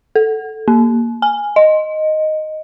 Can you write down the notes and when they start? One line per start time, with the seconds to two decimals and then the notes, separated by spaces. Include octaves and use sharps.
0.16 A4
0.68 A#3
1.22 G#5
1.56 D#5